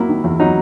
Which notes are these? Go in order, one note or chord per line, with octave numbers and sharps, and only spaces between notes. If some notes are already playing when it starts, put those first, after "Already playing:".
Already playing: F#3 A#3 E4
D#3
E2
F#3 D#4